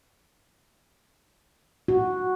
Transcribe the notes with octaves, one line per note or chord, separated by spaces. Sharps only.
F#4